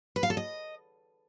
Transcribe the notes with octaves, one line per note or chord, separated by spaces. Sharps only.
B4
F5
A4
D#5